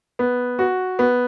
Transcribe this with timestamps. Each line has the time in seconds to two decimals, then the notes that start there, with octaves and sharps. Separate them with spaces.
0.19 B3
0.59 F#4
0.99 B3